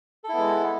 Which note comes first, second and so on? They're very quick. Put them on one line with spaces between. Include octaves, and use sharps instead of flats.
A4 E4 B3 G#3